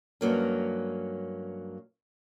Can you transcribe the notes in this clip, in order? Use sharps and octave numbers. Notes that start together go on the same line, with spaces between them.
G2 F#3 A#3 C#4